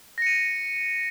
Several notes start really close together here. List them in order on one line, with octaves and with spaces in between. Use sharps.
A#6 C#7 D#7